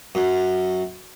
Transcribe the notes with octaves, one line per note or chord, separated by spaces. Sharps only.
F#2